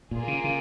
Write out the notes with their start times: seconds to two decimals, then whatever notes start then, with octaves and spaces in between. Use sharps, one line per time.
0.11 A#2 A#3 F4 G#4
0.28 C#3
0.44 C#3